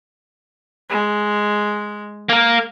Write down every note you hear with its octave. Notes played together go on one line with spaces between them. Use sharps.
G#3
A#3 A#4